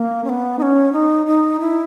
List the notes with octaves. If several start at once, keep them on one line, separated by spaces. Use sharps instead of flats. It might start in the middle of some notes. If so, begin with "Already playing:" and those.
Already playing: A#3
C#4
B3
D#4
C#4
D#4
D#4
E4